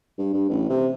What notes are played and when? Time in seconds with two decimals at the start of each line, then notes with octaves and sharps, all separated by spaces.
0.18 G2
0.33 G2
0.50 A1
0.69 C3